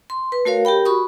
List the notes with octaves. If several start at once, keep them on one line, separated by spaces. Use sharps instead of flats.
C6
B4
A3 F#4 A#4 C#5 F5
G4 A#4 G5 B5
F#4 B5 C#6 D#6